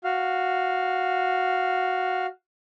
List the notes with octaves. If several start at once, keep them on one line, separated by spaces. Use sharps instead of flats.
F#4 F5